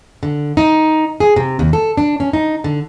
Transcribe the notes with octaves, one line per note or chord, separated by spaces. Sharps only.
D3
D#4
G#4
C3
D#2
A4
D4
C#4
D#4
D3